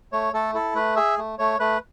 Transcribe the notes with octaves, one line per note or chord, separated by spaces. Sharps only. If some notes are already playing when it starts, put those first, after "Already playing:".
A3 C#5
A3 A4
E4 A4
A3 B4
G#4 E5
A3
A3 C#5
A3 B4